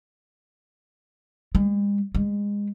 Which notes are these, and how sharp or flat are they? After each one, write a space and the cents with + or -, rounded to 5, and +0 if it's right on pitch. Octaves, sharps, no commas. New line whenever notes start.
G#3 -45
G#3 -25